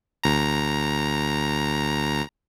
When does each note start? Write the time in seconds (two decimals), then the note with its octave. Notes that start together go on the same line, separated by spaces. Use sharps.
0.24 D2 A#5